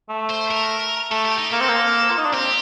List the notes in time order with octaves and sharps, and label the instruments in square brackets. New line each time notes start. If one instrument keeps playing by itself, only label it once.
[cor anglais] A3
[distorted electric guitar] C5
A#4
[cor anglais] A3 [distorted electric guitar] A4
[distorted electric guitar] G4
D#4
[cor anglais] A#3 [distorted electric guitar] A4
[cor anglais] C4
A#3
F4
D#4
D4
[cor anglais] C4 [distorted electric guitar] G4